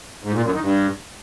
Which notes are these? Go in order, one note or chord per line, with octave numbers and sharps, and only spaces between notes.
G#2
A#2
F#2
D#3
G2